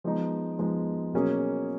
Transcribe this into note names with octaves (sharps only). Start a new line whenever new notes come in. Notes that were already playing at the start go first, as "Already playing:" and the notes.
F3 G#3 B3 D#4
F3 G#3 B3 D#4
B2 F#3 A#3 C#4 G#4